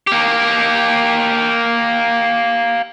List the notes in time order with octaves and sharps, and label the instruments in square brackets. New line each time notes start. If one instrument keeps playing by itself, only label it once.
[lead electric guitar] A#3 G4